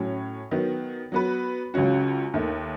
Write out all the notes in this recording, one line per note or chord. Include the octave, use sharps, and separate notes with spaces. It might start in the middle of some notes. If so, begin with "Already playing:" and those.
Already playing: A2 F#3 C#4
D#3 F#3 B3
F#3 B3 F#4 B4
C#2 C#3 F#3 C#4 F#4
D#2 D#3 A3